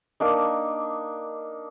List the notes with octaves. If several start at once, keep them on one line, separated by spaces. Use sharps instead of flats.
A#3 D4 D#4